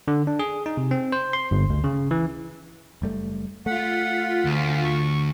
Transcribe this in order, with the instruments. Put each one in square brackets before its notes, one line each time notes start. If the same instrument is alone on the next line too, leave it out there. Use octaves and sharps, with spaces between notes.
[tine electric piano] D3
D4
G#4
D#4
C3
C4
C5
C6
G1
D2
C#3
E3
[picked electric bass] F#1 G3 A3
[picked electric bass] A3 [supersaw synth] F4 B6 [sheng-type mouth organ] F#5
[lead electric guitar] D2
[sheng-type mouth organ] C#6